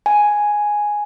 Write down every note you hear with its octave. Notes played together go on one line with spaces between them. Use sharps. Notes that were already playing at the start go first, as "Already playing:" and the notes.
G#5